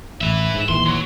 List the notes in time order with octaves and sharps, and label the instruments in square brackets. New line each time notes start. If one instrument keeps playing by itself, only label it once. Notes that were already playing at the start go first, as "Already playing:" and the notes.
[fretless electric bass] A1 [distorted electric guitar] B4 E5
[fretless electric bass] G#2
[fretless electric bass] A#1 D#2 E3 [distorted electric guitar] C6
[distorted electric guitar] F#3